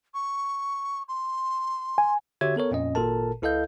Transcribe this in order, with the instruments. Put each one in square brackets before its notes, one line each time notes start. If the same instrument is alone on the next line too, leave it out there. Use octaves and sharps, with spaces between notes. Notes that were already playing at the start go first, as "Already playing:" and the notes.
[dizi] C#6
C6
[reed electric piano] G#5
[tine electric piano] D3 F#4 G4 C#5 E5 G#6
B3 A4 A#4 C#5
F2 A#2 C#4 D#5
G#1 A#2 A4 A#4 A5
C#2 E4 A4 D#5 F5 G6